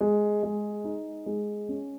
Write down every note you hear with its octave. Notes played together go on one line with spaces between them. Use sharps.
G#3
G#3
D#4
G#3
C#4